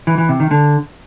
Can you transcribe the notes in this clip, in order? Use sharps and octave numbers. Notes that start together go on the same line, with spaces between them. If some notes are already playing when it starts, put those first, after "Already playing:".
E3
E3
C3
D#3
D3